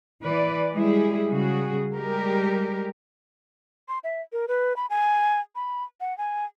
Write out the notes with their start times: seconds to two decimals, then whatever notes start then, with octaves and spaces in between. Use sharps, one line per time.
0.22 E3 B4 D5
0.73 G3 G#3 E4 G#4
1.31 C#3 G3 F#4 G#4
1.96 G3 G#3 G4 A#4
3.89 C6
4.04 E5
4.32 A#4
4.48 B4
4.76 B5
4.90 G#5
5.55 B5
6.01 F#5
6.18 G#5